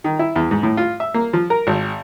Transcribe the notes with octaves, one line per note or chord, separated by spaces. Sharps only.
D#3
E4
E2
G#2
A2
F4
E5
A#3
F3
A#4
G#1